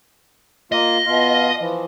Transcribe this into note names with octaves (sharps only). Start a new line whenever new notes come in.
A#3 F4 D#5
B2 F4
E3 F3